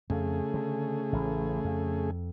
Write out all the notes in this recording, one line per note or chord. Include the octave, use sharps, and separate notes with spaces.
F2 C#3 A3 G#4
D3
A1
F2